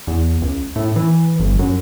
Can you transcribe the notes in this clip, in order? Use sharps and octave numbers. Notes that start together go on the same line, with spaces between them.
E2
C#2
A2
E3
G1
F#2